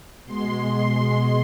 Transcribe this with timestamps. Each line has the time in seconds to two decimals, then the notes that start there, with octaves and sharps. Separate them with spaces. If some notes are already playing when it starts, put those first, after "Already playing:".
0.25 B2 G#3 C6
0.78 C6